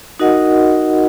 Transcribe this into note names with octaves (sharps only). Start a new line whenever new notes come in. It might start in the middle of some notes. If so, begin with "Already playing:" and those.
D#4 F#4 A#4 D#5 F#5